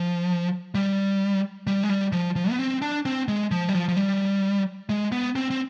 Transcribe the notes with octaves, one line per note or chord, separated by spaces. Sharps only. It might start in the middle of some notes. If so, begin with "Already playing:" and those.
Already playing: F3
G3
G3
G#3
G3
F3
F3
B3
C4
D4
C4
G#3
F3
G3
F3
F3
G3
G#3
B3
C4
C4